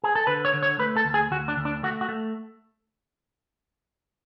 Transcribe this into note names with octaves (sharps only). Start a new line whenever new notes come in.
G#4
A4
D3 B4
C#5
D3
C#5
A3 B4
A4
D2
G#4
D2 F#4
D4
D2
D4
A3 F#4
F#4
A3